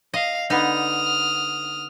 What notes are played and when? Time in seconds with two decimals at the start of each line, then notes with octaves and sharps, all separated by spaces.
0.14 D#5 F5
0.50 D3 B3 D#4 D#6 F6